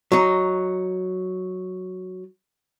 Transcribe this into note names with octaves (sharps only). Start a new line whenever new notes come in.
F#3 D#4